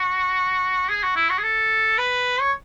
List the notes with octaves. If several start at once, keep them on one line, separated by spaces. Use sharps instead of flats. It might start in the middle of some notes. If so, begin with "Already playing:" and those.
Already playing: F#4
G#4
F#4
E4
F#4
G#4
A4
B4
C#5